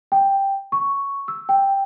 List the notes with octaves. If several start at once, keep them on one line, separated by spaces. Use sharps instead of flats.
G5
C#6
E6
G5